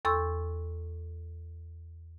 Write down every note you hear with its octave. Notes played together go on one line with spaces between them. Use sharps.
E2 A4 C6 C#6 E6